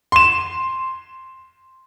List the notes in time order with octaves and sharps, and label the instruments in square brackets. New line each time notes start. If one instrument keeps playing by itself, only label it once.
[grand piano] C6 E7